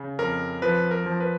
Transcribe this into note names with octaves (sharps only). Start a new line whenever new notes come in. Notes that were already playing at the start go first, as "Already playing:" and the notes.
Already playing: C#3
F2 A#4
F3 B4
A#4
F3
B4